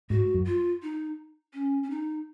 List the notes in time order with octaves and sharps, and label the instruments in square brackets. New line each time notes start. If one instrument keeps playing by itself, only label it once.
[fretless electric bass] G#2 [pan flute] F#4
[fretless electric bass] F#2
[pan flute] F4
D#4
C#4
C#4
D#4